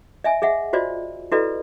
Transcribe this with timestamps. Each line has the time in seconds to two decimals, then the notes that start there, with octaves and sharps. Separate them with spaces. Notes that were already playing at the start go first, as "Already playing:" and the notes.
0.24 D#5 E5 G#5
0.42 G#4 D#5 E5 F#5
0.73 F4 F#4 C5 D5 D#5
1.32 E4 F#4 A4 B4 D5 D#5